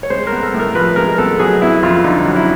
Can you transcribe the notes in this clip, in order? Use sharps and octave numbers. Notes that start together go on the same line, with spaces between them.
C#5
G#3 C5
A#4
B3
A4
A2
A#4
F3 B4
G#3 A#4
B3 A4
F#3 G#4
B3 E4
F2 F4
D3 D#4
F#3
E4